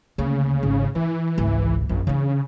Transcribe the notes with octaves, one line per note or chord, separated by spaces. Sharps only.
D2 C#3 A#3
G#1
E3 E4
G#1 C#2
A#1 F#2
C#3 E3 D4